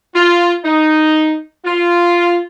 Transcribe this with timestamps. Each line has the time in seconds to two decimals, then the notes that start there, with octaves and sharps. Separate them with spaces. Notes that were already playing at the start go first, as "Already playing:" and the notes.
0.15 F4
0.64 D#4
1.65 F4